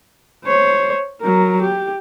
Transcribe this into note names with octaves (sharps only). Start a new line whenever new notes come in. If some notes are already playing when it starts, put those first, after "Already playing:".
C5 C#5
F#3 A#4
G4